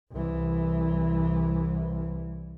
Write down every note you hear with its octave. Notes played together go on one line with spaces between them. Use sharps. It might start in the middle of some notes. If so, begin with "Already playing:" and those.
C2 E3